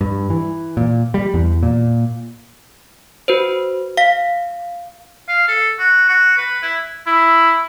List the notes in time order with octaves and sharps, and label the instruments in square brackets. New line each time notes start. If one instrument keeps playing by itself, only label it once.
[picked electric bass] G2
E3
A#2
G3
E2
A#2
[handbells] F#4 B4 C5
F5 B6
[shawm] F5
A4
F#4
F#4
B4
E4
[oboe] E4